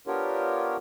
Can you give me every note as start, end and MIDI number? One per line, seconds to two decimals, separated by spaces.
0.07 0.77 59
0.07 0.77 62
0.07 0.77 65
0.07 0.77 67
0.07 0.77 70
0.07 0.77 73